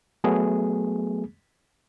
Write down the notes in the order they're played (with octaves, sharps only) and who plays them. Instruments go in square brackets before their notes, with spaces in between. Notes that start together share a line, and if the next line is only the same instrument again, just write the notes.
[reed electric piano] F#3 A3 B3 G#4